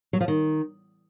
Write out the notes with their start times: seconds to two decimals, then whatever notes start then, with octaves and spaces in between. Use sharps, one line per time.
0.13 F#3
0.21 F3
0.28 D#3